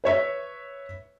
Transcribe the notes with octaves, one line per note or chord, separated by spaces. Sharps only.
B4 C#5 E5